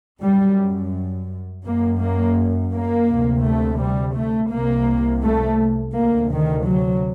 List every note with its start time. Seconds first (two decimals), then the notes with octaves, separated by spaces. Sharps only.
0.22 F#2 G3
1.64 F#2 A#3
2.00 A#3
2.72 A#3
3.09 D2 C3
3.44 A3
3.80 G3
4.16 A3
4.51 C2 C3 A#3
5.24 A3
5.95 D2 C3 A#3
6.31 D#3
6.67 F#3